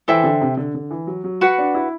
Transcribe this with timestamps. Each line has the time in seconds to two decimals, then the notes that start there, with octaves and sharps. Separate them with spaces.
0.08 E3 A4 C5 E5 G5
0.24 D3
0.41 C3
0.57 D3
0.74 D3
0.91 E3
1.07 F#3
1.24 F#3
1.41 F#4 B4 F#5
1.58 D4
1.75 E4